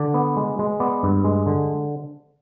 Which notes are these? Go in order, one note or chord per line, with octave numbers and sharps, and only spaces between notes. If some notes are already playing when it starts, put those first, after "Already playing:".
Already playing: D3 D5
B3
G#3
G#3
B3 D5
G2
G#3
D3